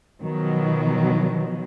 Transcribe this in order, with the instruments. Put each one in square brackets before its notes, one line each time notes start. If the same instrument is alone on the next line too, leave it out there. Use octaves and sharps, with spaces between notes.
[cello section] B2 D#3 F3 F#3